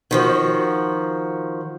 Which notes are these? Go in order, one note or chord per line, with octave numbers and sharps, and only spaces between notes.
D#3 F3 F#4